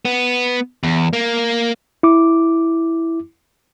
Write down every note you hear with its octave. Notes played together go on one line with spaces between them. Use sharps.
B3
E2
A#3
E4 D6